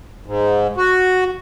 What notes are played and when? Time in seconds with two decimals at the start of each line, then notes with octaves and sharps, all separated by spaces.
0.26 G#2
0.77 F#4